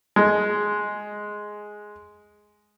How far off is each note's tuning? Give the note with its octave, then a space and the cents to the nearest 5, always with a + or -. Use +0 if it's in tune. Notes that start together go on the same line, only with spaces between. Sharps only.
G#3 +5